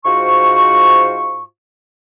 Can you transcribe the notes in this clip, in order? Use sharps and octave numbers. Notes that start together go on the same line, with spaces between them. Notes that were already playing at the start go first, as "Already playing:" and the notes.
G#2 F4 F#4 C5 C#6